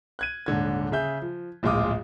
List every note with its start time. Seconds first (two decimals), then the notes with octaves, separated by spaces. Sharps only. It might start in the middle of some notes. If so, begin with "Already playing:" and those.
0.19 F#6 G#6 D#7
0.46 D#1 G#2 D3 G#6
0.92 C#3 G#4 E5 G6
1.22 F3
1.63 D1 A#1 G#3 F4 D6 D#6